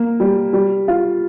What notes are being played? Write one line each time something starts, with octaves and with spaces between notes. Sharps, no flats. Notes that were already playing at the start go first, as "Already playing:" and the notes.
Already playing: A#3
G3
G3
F4